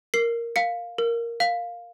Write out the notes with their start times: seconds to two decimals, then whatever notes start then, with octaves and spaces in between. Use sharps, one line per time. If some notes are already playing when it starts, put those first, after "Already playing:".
0.14 A#4 C7
0.56 F5 C#7
0.98 A#4
1.40 F5